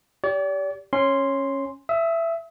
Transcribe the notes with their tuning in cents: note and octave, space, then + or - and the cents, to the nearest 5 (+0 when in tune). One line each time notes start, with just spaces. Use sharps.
G4 +0 D5 -40
C#4 -15 C6 +0
E5 +15 D#6 +45